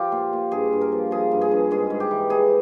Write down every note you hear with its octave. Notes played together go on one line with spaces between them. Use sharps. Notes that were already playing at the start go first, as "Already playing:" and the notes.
Already playing: F3 F4 G4
A#2
A#2
G2 G#4
G2
A#4
F3
F3 G#4
G2
G#4
G2
G#2 G#4
G#2
G4
E3
E3 G#4